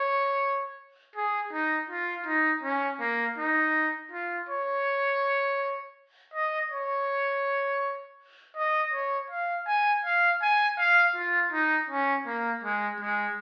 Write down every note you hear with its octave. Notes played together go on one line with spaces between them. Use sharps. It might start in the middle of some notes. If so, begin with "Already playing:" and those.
Already playing: C#5
G#4
D#4
F4
D#4
C#4
A#3
D#4
F4
C#5
D#5
C#5
D#5
C#5
F5
G#5
F5
G#5
F5
F4
D#4
C#4
A#3
G#3
G#3